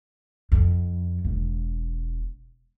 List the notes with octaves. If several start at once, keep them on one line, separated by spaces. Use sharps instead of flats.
F2
E1